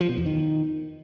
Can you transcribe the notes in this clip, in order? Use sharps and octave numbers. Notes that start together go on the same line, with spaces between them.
F3
B2
E2
D#3